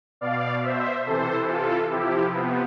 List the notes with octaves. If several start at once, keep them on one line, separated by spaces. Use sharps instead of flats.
B2 D5 F5
C5 E5
C3 E3 A4 C5
F4 A4
C3 F3 E4 G4
B3